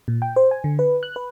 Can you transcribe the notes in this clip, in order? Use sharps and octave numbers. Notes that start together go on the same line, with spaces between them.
A#2
G5
C5
G#5
D3
B4
F#6
B4